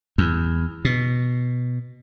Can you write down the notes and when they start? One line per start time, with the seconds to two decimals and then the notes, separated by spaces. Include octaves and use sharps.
0.18 E2
0.85 B2